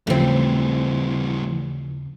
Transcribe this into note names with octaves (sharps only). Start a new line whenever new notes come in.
D#2 C#3 E3 F3 G3 A3 C4